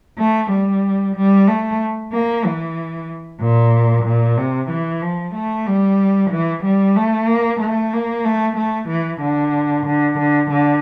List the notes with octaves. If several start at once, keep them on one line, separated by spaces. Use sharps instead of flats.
A3
G3
G3
A3
A#3
E3
A#2
A#2
C3
E3
F3
A3
G3
E3
G3
A3
A#3
A3
A#3
A3
A3
E3
D3
D3
D3
D3